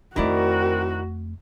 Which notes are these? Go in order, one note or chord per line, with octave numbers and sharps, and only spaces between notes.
F2 D#3 A3 C4 E4 F#4 A#4 D5